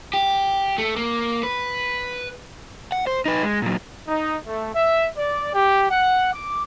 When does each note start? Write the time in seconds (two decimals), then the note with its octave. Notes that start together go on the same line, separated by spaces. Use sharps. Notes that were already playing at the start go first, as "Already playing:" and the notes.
0.13 G4
0.78 A3
0.96 A#3
1.43 B4
2.92 F#5
3.07 C5
3.26 D#4 B4
3.43 G#3
3.62 A#2 F#3
4.06 D#4
4.46 A3
4.75 E5
5.16 D5
5.53 G4
5.90 F#5
6.33 D6